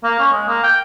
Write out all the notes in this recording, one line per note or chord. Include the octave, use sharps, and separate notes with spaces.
A#3
C#4
G#3
A#3
G5